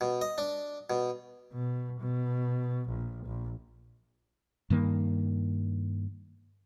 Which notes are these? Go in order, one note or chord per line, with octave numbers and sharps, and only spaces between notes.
B2
D#5
D4
B2
B2
B2
A#1
A#1
G2 D#3 A#3